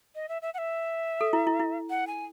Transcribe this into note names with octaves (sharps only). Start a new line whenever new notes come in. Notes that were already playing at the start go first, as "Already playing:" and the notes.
D#5
E5
E5
F#5
E5
A4
E4
E4
E4
F#5
G#5